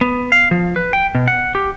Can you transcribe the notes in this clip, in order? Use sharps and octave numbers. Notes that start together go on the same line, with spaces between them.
B3
F5
F3
B4
G5
B2
F#5
G4